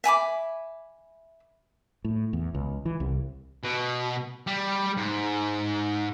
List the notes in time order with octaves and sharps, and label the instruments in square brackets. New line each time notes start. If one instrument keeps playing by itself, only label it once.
[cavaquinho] E5 G#5 B5 D6
[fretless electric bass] A2
E2
C#2
E3
C2
[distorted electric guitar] B2
G3
G#2